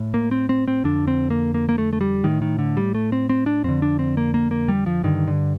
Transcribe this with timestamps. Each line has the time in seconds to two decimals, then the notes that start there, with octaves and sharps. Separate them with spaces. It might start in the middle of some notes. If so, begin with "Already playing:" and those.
Already playing: A2
0.14 A#3
0.31 C4
0.49 C4
0.68 C4
0.84 F2 D3 D4
1.08 C4
1.30 A#3
1.54 A#3
1.69 A#3
1.78 A3
1.93 A3
2.01 G3
2.24 A2 D#3
2.42 D#3
2.59 D3
2.77 G3
2.95 A3
3.12 C4
3.29 C4
3.46 D4
3.64 F2 D3 C4
3.82 D4
3.99 C4
4.17 A#3
4.34 A#3
4.51 A#3
4.68 G3
4.86 F3
5.03 G2 D3 D#3
5.27 D3